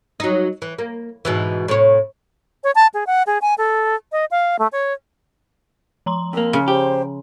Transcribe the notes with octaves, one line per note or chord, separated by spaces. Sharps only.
F#3 D#4
E3
A#3
G#2 B2 E3
A2 C3 C#5
C#5
A5
G#4
F#5
G#4
G#5
A4
D#5
F5
A3
C#5
F3 A#5 C6
F2 A#3 A#4
C#3 G#4
G4 C5